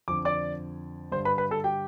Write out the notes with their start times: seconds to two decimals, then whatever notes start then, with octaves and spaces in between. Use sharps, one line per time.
0.08 F2 D3 D6
0.25 D5 D6
1.12 G2 D3 C5 C6
1.25 B4 B5
1.38 B4 B5
1.51 A4 A5
1.64 G4 G5